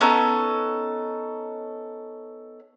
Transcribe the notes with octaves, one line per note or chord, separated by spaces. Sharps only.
B3 C#4 D#4 A4